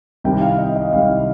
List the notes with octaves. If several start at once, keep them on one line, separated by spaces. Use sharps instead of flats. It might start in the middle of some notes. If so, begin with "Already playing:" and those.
C2 C3 D#3 G3 G5
F5
D#5
D#5
C2 C3 D#3 G3 F5